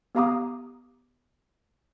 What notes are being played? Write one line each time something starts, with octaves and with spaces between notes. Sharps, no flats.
B3 G4 F5 A#5 D6 D#6